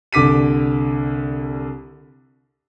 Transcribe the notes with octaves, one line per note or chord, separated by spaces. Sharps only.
C2 D3 D6 B6 D#7